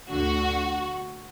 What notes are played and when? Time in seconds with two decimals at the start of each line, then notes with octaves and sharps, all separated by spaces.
0.09 D2 D3 F#4